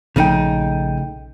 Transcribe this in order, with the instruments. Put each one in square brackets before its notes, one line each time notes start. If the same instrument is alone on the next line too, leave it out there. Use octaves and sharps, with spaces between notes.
[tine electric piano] A#1 G5 [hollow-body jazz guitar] C#3 A3 D#4